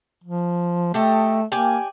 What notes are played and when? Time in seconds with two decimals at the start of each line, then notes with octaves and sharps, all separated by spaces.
0.24 F3
0.94 A3 G4 A4 D#5
1.52 A#3 G4 D5 G#5